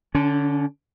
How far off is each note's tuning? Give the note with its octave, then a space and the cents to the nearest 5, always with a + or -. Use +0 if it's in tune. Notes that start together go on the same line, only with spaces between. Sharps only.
D3 +0 C#4 +35